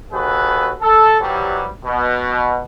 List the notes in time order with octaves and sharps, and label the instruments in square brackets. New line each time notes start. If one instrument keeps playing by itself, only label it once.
[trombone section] D#2 F#4 G#4 A4 B4
A4
C3 E3 F#3 G3
B2